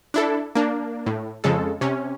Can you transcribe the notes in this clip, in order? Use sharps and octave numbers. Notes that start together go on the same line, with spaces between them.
D4 E4 A4
A#3 D4
A2
F2 C#3 G#3 A4
C3 C#4